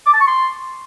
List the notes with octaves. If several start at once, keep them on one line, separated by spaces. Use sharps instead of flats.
D6
A5
C#6
C6